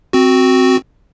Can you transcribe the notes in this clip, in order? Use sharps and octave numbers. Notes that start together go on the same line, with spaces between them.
C4 F#4